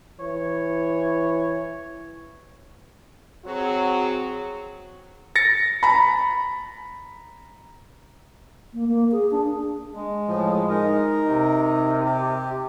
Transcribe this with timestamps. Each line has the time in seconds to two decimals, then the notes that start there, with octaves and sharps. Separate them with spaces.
0.20 E3 C#5
3.46 F#3 C4 F#4 G#4
5.36 A6 A#6 C#7
5.83 A#5 B5
8.74 A#3
8.88 A#3
9.12 G#4
9.31 D4
9.94 G#3
10.28 A2 F3
10.70 D#4 A#4
11.27 C3
12.05 G4